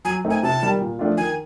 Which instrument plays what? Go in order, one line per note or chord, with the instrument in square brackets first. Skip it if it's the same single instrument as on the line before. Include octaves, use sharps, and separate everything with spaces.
[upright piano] F#3 [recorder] G#5
[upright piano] A3 C4 D#4
[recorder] G#5
[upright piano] C3 [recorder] A5
[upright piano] D#3 G3
A#2
F3 A3 D4 F4
[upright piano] D#3 [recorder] G#5